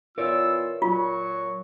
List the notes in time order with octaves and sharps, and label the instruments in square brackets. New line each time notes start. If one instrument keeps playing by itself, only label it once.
[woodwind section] E3 B3 F4 [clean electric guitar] A#4 C#5 D5 [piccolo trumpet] E6
[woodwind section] A#2 F#3 [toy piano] F4 [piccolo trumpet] C#6